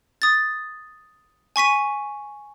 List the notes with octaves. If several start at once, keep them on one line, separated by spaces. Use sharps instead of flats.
D#6 A6
G#5 C#6 B6 D#7